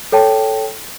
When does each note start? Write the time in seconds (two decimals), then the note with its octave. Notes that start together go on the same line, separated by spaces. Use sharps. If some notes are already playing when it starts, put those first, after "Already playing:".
0.12 A4 C#5 G5 A5